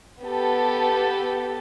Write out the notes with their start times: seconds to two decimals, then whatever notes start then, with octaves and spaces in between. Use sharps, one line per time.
0.22 B3 G4 A4